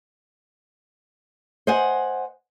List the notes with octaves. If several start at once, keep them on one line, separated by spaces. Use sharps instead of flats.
C5 D#5 F#5 G#5